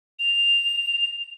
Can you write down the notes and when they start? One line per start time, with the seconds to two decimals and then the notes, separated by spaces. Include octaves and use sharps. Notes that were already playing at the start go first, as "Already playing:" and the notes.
0.19 F7